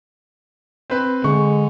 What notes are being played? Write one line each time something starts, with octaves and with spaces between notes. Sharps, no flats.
C4 B4
D3 G#3 C#6